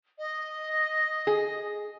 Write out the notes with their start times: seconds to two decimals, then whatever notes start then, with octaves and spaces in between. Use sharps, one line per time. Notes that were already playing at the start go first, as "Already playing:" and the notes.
0.19 D#5
1.27 G#4